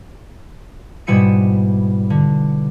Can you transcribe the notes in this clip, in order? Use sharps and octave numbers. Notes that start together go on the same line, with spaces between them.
G#2 B2 G3 E4 C#7 D#7
D3